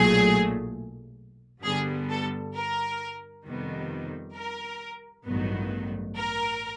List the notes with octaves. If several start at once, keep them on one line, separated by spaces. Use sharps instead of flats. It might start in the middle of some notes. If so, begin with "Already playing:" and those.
Already playing: B1 A#2 F#3 A3 G#4
G2 D3 G3 B3 G#4
A4
A#4
F2 C3 D#3 G3 B3
A#4
A1 G2 D#3 F#3 B3
A#4